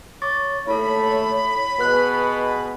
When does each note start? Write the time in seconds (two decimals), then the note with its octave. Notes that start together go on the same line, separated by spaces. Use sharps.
0.22 C#5 C#6 D6 A6
0.67 D#2 A3 E4 A4 B5
1.80 B2 G#3 B3 B4 F#6